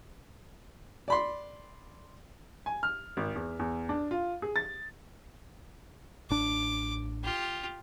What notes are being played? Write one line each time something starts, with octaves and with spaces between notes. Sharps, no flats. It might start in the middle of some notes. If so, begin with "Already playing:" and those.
D5 B5 C6
G#5
F6
G#1
E2
E2
D4
F4
G#4
A6
A1 D4 D6
F4 G4